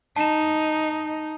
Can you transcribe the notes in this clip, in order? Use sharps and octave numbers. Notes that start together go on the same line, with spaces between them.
D#4 A5 E7